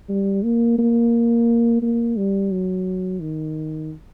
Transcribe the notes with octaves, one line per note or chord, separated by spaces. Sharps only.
G3
A#3
A#3
A#3
G3
F#3
D#3